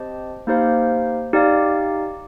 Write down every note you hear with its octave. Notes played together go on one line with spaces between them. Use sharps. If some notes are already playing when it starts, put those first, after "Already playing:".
Already playing: C4 G4 C5 D#5 A5
A#3 D#4 G4 C5 F5
D#4 G4 D5 F5